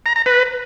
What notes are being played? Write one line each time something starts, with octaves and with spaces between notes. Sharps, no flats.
A#5
A#5
B4